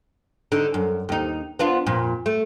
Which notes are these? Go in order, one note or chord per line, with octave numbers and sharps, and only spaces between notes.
D3 D#4
F#2
D#2 D#4
B3 D4 F4
F2 A#2
A3